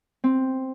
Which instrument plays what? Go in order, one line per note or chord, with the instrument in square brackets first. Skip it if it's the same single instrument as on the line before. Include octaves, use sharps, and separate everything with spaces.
[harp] C4